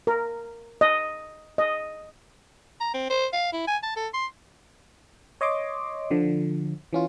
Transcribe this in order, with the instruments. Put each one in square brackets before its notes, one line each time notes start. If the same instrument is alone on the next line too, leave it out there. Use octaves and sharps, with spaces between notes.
[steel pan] A#4
D#5
D#5
[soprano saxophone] A#5
C4
C5
F5
E4
G#5
A5
A4
C6
[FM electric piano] C#5 D#5 C6 D6
D3 F3
E3 C#4 F4